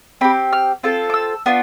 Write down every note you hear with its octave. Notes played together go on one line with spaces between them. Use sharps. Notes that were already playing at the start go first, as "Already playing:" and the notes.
C4 G4 B5
F6
C4 F4 A4
D6
E6
B3 D4 F4